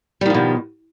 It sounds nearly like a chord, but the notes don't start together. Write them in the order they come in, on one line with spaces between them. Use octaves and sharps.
G3 D#3 F3 B2